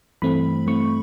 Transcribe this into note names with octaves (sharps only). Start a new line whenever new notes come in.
G2 E3 A3 C4 B5
G2 E3 A3 C4 C#6